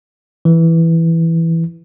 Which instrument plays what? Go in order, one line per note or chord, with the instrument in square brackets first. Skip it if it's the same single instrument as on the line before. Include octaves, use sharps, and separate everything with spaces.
[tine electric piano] E3